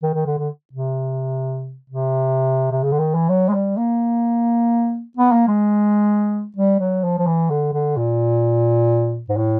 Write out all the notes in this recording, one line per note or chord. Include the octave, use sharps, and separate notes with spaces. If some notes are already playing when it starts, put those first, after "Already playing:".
D#3
D#3
D3
D3
C3
C3
C3
C#3
D3
D#3
E3
F#3
G#3
G3
A#3
B3
A#3
G#3
G3
F#3
F3
F3
E3
D3
D3
A#2
G#2
A2